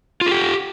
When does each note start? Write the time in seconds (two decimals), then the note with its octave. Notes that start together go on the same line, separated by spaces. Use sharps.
0.21 F4
0.26 G#4
0.31 G4